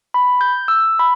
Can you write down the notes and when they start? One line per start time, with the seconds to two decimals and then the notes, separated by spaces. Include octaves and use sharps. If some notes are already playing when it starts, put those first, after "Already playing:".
0.14 B5
0.41 G6
0.68 E6
0.99 B5